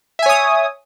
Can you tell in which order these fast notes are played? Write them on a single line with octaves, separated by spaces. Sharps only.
E5 G#5 C#5 D#6